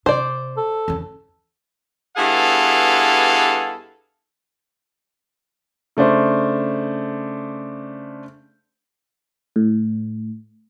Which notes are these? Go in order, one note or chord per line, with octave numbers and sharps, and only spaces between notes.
C3 C5 D5
A4
E2 C#3
G2 B3 E4 G#4 A4 F5
C#3 A3 D4 C5
A2